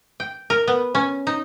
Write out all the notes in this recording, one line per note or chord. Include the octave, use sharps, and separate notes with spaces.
G5
A#4
B3
C#4
D#4